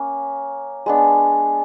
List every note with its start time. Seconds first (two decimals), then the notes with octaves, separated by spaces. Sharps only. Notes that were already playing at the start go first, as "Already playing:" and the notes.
Already playing: A#3 C#4
0.86 G#3 B3 D4